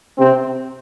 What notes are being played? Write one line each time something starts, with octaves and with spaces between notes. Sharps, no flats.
C3 C4